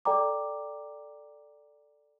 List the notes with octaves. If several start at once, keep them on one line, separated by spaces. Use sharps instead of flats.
A4 D5 G5 A#5 D6